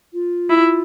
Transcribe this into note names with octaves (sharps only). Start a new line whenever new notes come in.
F4
E4